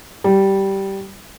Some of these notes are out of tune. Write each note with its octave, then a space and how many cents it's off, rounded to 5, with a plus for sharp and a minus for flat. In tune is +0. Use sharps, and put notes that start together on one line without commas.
G3 -10